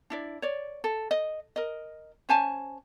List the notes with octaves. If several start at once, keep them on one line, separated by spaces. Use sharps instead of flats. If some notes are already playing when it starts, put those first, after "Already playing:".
D4 E4 D5
C#5 D5
A4
D#5
A#4 D#5
C#4 C5 G#5 A5